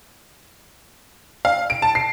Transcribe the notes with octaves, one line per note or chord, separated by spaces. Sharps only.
F5
D7
A5
C7